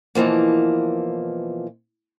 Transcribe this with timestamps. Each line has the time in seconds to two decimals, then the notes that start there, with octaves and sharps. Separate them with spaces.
0.15 B2 E3 F3 A#3